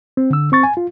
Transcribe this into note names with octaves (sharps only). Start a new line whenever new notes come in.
C4
D3 E6
C4 C#6 A6
G#5
F4